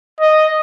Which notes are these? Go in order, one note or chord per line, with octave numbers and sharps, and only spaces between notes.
D#5